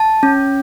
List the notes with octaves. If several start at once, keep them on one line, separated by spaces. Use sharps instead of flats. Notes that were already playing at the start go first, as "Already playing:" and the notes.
Already playing: A5
C#4